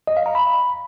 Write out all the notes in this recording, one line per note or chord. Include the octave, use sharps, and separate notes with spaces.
D#5
F5
A#5
B5